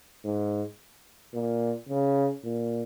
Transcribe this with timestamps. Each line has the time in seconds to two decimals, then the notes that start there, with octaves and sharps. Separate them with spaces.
0.24 G#2
1.34 A#2
1.89 C#3
2.44 A#2